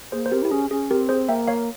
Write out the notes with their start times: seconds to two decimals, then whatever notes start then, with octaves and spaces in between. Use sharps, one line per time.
0.12 A#3 G#4 C5
0.26 C5
0.32 C4 G4 A#4
0.43 E4 G4
0.51 C#4 G#4
0.70 C#4 G#4
0.91 C4 G4 A#4
1.09 G#4 C5
1.29 A#3 E5 G5
1.48 C#5 F5